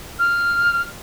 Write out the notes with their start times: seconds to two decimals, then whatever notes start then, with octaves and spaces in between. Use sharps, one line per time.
0.19 F6